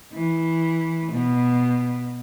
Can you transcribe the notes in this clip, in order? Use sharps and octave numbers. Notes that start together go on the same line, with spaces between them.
E3
B2